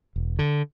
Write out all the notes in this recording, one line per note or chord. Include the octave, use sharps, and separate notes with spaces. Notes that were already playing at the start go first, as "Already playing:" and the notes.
E1
D3